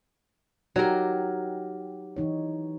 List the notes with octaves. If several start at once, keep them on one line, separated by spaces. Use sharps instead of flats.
F#3 D#4 G4 A#4
E3 D#4 C#5